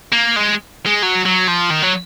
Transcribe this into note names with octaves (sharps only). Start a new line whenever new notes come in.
A#3
G#3
G#3
F#3
F#3
F3
D#3
F#3